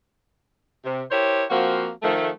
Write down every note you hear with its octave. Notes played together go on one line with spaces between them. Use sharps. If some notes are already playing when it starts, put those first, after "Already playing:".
C3
E4 G4 A#4 C5 C#5
F3 A#3 C4 F#4
D#3 F3 A3